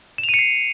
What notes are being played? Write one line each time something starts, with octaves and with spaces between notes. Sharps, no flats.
E7
F7
D#7
C#7
C7